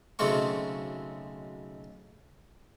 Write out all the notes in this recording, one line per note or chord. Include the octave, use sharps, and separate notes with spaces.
B1 C#3 G#3 A3 C4 C#6